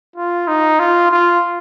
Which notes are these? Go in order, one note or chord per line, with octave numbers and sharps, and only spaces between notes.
F4
D#4
F4
F4